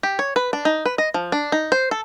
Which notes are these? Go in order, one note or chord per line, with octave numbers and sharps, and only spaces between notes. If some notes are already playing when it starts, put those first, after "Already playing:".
G4
C#5
B4
D4
D#4
B4
D#5
F3
D4
D#4
C5
A4